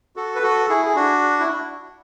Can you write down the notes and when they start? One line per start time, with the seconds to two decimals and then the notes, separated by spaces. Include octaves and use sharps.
0.16 F#4 A4
0.36 B4
0.43 F#4 A4
0.69 E4 G#4
0.86 G#4
0.95 D4 F#4
1.40 E4